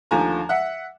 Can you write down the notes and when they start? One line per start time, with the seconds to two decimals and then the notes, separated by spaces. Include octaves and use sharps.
0.11 D#2 D3 F3 A3 G#5 A#5
0.49 E5 F#5